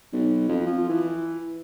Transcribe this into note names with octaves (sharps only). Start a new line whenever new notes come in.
B1
F2
F3
E3